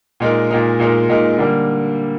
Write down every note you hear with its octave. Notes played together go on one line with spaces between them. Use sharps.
A#2 G#3 D#4 A#4
A#2 G#3 D#4 A#4
A#2 G#3 D#4 A#4
A#2 G#3 D#4 A#4
D3 G3 A#3